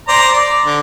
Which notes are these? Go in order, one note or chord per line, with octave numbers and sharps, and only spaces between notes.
C5 D5 A#5
D5
D3